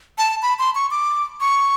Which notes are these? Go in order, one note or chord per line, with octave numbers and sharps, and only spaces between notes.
A5
B5
C6
C#6
D6
C#6